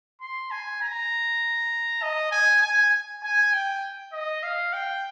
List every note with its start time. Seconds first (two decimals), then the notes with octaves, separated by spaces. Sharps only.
0.21 C6
0.51 G#5
0.82 A#5
2.03 D#5
2.32 G#5
2.62 G#5
3.23 G#5
3.53 G5
4.13 D#5
4.43 F5
4.73 G5